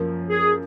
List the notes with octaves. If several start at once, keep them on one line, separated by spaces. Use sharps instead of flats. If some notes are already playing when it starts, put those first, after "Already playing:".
Already playing: F#2 F3 A#3
G#4